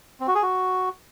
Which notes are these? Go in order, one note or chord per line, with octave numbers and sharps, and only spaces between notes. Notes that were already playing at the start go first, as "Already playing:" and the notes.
C4
F#4
G#4
F#4